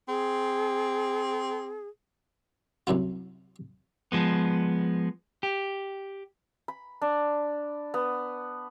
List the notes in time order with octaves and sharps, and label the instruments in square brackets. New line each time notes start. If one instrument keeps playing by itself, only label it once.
[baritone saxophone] C4 [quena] G#4
[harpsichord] C2 F#2 E4 F4
[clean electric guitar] F3 G#3 B3
G4
[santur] B5
D4
B3